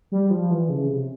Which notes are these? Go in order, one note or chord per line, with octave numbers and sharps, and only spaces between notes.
G3
F3
E3
C#3
C3